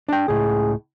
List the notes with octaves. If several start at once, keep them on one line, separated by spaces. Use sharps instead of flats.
D4 G5
C#2 A2 G#4